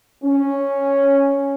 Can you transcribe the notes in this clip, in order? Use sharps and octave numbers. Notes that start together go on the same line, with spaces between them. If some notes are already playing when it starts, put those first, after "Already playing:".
C#4